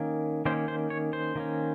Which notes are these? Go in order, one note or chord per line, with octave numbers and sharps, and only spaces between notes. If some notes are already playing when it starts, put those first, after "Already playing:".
Already playing: D#3 A#3 C#4
D#3 A#3 C#4 C5
C5
C#5
C5
D#3 A#3 C#4